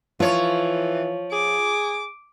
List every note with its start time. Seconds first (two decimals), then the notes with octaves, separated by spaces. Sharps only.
0.20 E3 F3 F4 C#5
1.32 G#4 D6